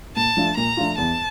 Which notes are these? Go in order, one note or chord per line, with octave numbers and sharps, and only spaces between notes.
A#2 A5
F3 A3 D4 F4
A#2 A#5
F3 A3 D4 F4
E2 A5